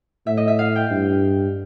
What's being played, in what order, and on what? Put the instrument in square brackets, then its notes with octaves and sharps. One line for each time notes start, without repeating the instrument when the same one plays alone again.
[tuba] A2 [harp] E5
[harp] D#5
E5
F5
G5
[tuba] G2